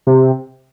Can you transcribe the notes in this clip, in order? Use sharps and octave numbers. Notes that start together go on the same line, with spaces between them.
C3